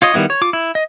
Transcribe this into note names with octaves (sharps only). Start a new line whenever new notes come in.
F4 C#5 D#5
D#3 G3 B3 E4
C#5
F4 D6
E4
D#5